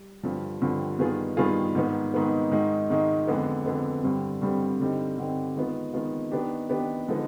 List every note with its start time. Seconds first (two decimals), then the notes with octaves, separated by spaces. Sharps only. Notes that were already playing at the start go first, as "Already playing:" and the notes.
Already playing: G3
0.23 G2 D3 F3
0.62 G2 D3 F3
0.99 G2 D#3 B3 F4 G#4
1.37 G2 D#3 B3 F4 G#4
1.75 G#2 D#3 B3
2.14 G#2 D#3 B3
2.52 G#2 D#3 G#3
2.90 G#2 D#3 G#3
3.27 F2 D3 G#3 B3
3.66 F2 D3 G#3 B3
4.03 G2 D3 G3 C4
4.42 G2 D3 G3 C4
4.79 G2 D3 G3 C4 D#4
5.18 G2 D3 G3 C4 D#4
5.55 D#3 G#3 B3 F4
5.93 D#3 G#3 B3 F4
6.31 D#3 B3 D4 G4
6.70 D#3 B3 D4 G4
7.08 D3 F3 G#3 B3 D#4